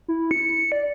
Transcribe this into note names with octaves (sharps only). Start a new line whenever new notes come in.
E4
C#7
D5